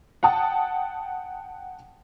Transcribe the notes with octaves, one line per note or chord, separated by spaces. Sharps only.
F#5 G5 A5 D#6